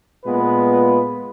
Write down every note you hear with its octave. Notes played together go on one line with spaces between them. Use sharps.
A#2 G#3 B3 F4 B4